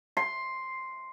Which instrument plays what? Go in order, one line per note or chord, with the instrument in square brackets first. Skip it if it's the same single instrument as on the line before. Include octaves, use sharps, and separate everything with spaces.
[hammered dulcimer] C6